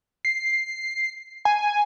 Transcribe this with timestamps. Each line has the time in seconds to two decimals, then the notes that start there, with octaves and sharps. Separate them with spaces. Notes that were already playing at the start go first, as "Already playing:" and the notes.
0.25 C7
1.45 G#5